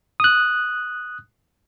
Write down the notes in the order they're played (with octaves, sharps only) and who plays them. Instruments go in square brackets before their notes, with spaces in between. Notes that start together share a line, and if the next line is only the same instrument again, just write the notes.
[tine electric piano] D#6 F#6